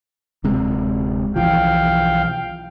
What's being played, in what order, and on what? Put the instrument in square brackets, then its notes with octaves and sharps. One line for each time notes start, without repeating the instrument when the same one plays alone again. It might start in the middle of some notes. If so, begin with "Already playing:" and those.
[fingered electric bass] D1 C3 G#3
[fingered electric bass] B1 E3 F3 [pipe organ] F5 G5